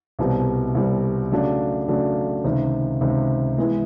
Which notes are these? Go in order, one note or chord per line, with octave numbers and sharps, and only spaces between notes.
C2 B2 G3 C4
C2 B2 G3 C4
C#3 F#3 A3 D4
C#3 F#3 A3 D4
C#2 C3 D#3
C#2 C3 D#3
E3 G#3 B3 E4